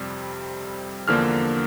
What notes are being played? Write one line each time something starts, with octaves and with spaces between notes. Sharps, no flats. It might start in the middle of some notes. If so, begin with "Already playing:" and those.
Already playing: F2 C3 G3 C4
E2 D3 F3 A#3 D4 F6